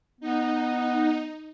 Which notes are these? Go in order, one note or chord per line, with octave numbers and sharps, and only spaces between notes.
B3 D#4